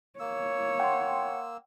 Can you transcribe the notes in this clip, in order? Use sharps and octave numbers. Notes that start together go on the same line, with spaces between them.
A#3 C#5 E6
F#5 G5 C6